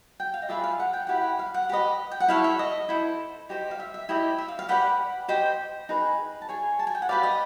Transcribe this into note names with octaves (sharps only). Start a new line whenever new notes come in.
G5
F5
D#5
F4 G#4 B4 D5 E5
F5
F#5
G5
E4 G4 B4 F#5
F5
F#5
G4 B4 D#5
G5
F#5
E4 A4 C#5 F5
E5
D#5
E4 A4 C5
D#4 G4 C5 D#5
F5
E5
E5
E4 G4 C5 D#5
E5
F5
F5
G4 B4 D5 F#5
G4 C5 D#5 G5
D#4 G#4 B4
A5
G#4 C#5 G#5
A5
G#5
G5
F#5
G4 B4 D5 F5
D#5